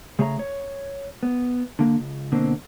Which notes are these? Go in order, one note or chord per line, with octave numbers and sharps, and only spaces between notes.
C#3 A3 G#4 C#5 G5 A#5
C#5
B3
D3 A#3
C#2
B2 D3 A#3 C4